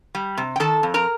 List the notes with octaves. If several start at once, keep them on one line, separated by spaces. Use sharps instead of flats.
G3
C3
G5
D#3 A4 A5
F2
A#4 A#5